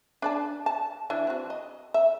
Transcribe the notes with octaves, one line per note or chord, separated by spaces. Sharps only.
D4 D5 A5
A5
E3 D4
C4 F#4
D#5
E5